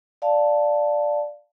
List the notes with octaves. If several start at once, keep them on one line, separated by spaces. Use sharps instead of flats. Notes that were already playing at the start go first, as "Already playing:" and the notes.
D5 F5 A5